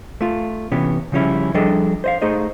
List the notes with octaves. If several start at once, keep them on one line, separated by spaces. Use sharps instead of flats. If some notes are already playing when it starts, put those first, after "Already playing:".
A3 F4
C3 E3 B3 C#4
C#3 F3 G3 C#4 E4
F3 G3 D4 G#4 A4 D#5
C5 D#5 F5
A3 D#4 G#4 C5 D#5